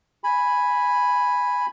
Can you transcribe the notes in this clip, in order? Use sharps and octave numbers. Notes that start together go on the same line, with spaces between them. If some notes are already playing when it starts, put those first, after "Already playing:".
G#5 B5